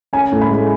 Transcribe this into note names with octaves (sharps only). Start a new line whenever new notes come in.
C#4 G#5
A2
B5
G#3